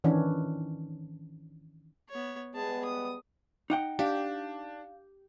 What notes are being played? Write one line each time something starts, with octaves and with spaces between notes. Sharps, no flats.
D#3 E3 C#4 D4
B3 C#5
G3 G#3 B3 G#4 A5
D#6
D#4 F#5 G5
D4 G4 F5